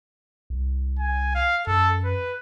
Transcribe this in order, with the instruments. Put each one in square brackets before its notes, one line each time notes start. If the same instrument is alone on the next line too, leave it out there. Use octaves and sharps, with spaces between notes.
[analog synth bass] C2
[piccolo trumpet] G#5
F5
[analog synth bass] F#2 [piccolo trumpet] A4
[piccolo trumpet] B4